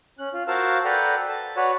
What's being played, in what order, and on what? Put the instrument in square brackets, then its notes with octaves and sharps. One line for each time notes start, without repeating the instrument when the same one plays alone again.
[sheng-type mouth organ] C#4 F#6
F4
F#4 A#4 C5 F5 A5 E6
A4 B4 D5 F#5 G5 A#5
A5
F#4 B4 C#5 D5 F#5